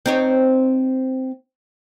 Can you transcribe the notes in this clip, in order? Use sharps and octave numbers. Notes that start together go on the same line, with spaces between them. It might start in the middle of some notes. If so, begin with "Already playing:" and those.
C4 D#4 C#5